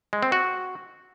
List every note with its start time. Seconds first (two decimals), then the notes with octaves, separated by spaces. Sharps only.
0.13 G#3
0.23 C4
0.32 F#4